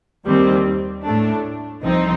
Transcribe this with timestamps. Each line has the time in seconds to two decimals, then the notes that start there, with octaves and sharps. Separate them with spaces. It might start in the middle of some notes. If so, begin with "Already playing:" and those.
0.25 D#2 D#3 G3 C4
1.04 A2 A3 D4
1.83 C2 C3 F3 C4 D#4